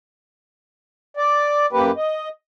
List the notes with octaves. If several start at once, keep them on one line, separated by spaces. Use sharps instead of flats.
D5
F#2 A#3 G4 B4
D#5